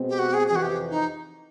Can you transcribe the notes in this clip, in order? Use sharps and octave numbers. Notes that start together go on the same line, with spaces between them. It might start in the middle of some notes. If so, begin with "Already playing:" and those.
Already playing: B2 G#3 C4
G4
F#4
G#4
F2 C3 E3 G#4
F#4
G4
D#4